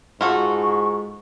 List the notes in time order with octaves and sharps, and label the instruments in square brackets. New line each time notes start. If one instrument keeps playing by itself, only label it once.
[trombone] G#2 [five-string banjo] F4 F#4 A4 [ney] C#6